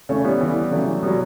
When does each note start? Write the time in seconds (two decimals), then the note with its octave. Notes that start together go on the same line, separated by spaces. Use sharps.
0.09 C#3 E3 A3 C#4
0.24 G3 B3
0.40 C#3 E3
0.71 C#3 E3 F#3 A3
1.02 B2 F#3 G3 B3